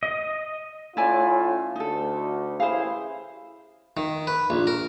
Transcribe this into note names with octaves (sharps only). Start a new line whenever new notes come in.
D#5
A2 C#4 E4 F4 D5 G#5
D2 D#4 A4
A1 E4 G#4 C5 F5
D#3
B4
A#1
A#4